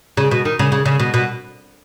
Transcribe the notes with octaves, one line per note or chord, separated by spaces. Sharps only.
C#3
B2
D#3
C#3
C#3
C#3
B2
B2